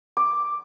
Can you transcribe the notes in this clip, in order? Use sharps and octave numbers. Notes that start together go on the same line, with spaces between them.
D6